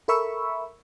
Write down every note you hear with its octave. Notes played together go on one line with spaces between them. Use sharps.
A4 A#4 E5 B5 C#6 E6